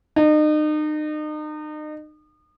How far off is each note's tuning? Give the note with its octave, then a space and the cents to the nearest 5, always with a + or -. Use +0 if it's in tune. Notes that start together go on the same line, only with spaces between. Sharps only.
D#4 -35